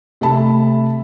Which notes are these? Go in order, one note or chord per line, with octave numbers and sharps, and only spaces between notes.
C3 A3 E5 A5 B5